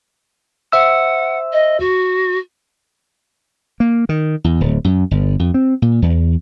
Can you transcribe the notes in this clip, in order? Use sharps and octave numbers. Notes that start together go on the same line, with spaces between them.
C5 E5 F#5 E6
D#5
F#4
A#3
D#3
E2
D1
F#2
G1
F2
C4
A#2
E2